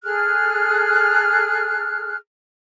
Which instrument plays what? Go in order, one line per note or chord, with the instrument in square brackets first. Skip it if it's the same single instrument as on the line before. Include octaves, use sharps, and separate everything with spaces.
[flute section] G#4 A4 F6 F#6